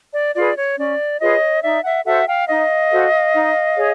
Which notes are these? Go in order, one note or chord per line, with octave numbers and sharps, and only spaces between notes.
D5
F4 G#4 B4 D5
C#5
C#4 D5
F4 G#4 B4 C#5 D#5
D#4 D5 E5
E5 F#5
F#4 A4 C5 E5 F#5
F5 G5
D#4 D#5 F5
F#4 A4 C5
D#4
G#4 C#5